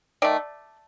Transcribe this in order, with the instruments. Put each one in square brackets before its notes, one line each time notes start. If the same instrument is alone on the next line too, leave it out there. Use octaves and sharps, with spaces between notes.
[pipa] D#3 A3 D5